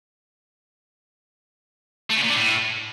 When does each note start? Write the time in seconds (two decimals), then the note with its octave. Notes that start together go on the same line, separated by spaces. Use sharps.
2.10 A3
2.17 C#3
2.23 A#2
2.30 D3
2.36 A2